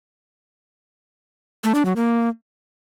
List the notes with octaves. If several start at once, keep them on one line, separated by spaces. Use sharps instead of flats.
A3
D4
F#3
A#3